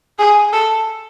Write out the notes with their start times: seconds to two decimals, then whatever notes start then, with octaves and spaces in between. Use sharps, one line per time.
0.19 G#4
0.53 A4